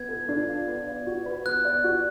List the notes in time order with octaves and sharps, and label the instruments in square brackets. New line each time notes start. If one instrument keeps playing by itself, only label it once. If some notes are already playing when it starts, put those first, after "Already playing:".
Already playing: [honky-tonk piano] B3 [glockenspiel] G#6
[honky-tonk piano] A4
D4
F4
B3
D5
F#4
B4
[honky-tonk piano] B3 [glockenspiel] F#6
[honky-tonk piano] D5
F#4